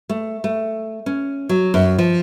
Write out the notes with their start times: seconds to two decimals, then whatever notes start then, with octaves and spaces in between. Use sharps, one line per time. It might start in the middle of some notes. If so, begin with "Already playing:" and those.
0.09 A3
0.44 A3
1.06 C#4
1.49 F#3
1.74 F#2
1.98 F3